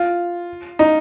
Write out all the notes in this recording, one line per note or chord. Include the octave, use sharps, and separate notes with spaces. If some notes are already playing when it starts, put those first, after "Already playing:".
Already playing: F4
D#4